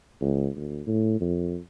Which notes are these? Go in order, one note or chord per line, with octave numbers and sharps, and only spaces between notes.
C#2
D2
A2
F2